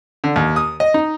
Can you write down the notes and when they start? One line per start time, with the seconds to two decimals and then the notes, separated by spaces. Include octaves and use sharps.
0.24 D3
0.36 D#2
0.56 D#6
0.80 D#5
0.94 D#4